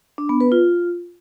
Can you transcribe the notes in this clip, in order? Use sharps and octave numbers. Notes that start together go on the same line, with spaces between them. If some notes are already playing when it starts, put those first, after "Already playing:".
D4
B3
B4
F4